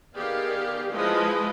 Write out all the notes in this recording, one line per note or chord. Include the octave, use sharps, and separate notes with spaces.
D#3 B3 G4 G#4 D5 F5
F3 G#3 E4 F4 B4 D#5